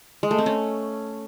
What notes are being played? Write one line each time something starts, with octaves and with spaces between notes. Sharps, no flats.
G#3
A3
C4
C#4